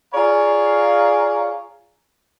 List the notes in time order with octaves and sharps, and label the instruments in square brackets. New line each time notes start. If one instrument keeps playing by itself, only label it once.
[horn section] F4 G#4 C#5 D5 F5 A#5